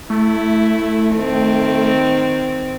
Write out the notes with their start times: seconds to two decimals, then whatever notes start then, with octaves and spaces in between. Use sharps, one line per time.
0.10 A3 E4
1.14 D#3 C4